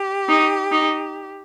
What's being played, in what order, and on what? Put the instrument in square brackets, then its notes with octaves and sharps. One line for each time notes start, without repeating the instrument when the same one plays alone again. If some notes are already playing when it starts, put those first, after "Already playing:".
Already playing: [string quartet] G4
[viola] D#4
D#4